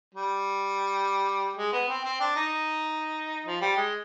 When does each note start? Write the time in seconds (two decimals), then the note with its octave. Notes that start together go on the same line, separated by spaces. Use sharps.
0.14 G3
1.57 G#3
1.72 B3
1.88 C4
2.04 C4
2.20 D4
2.36 D#4
3.46 F3
3.61 G3
3.77 G#3